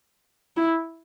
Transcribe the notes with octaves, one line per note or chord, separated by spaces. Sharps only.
E4